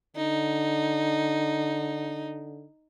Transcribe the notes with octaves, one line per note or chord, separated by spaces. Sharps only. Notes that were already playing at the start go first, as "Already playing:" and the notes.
D3 D#4